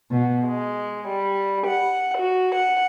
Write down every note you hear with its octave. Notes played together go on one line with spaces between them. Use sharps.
B2
G#3
G3
F#5
F#4
F#5